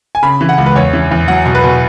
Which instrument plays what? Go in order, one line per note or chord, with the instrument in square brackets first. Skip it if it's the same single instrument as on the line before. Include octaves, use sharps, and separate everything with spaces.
[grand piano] G#5
C#3 B5
E3
F#5
C#2
B4
E2 C#5
E3
E2
F#3 F#5
B2
B4
B2